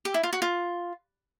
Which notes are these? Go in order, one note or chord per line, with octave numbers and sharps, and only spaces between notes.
G4
E4
F4
F#4
F4